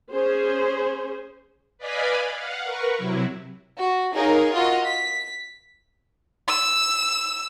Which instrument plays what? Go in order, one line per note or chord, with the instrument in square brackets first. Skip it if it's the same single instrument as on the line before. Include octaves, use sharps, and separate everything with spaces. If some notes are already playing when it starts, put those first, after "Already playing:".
[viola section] C#4 G#4 C5
[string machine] B4 D5 D#5 F5 G#5 B5
F5 F#5
A#4 B4 C#6
C3 F#3 E4
[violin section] F#4
D#4 G#4 A#4 C#5 F5
F4 F#4 D#5 F#5
B6
[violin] E6